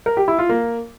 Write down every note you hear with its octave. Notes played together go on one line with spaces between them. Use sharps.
A#4
G4
E4
F4
A#3